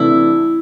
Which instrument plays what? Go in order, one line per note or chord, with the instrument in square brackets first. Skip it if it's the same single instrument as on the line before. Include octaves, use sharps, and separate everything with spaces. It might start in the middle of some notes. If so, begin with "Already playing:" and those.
Already playing: [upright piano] C3 E3 A3 D4 [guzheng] E4